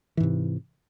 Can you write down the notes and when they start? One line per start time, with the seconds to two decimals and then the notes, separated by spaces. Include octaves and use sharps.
0.17 E3
0.20 G#2
0.23 C3